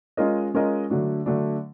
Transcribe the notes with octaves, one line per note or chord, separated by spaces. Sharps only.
G#3 C#4 F4 A#4 D#5
G#3 C#4 F4 A#4 D#5
D3 F#3 A3 D4
D3 F#3 A3 D4